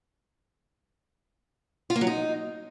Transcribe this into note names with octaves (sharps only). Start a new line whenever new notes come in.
F4
A#3
F#3
D#4